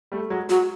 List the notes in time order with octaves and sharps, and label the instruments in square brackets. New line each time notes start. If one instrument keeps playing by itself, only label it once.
[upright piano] G3 A3
F#3 G#3
[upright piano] F#3 G#3 [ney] F#4